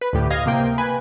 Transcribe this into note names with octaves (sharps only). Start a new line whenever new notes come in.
B4
D2 A2 G4
D#5 F5 G#6 A#6
C3 A#3 G5
B4 G#5